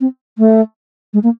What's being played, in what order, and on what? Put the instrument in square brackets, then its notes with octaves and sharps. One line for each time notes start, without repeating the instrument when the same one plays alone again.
[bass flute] C4
A3
G#3
A#3